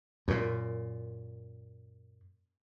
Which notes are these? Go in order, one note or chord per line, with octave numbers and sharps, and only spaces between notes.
F#2 A#2